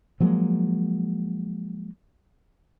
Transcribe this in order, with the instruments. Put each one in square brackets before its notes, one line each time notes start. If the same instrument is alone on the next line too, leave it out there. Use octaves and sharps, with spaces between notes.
[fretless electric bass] F3 F#3 G#3 A#3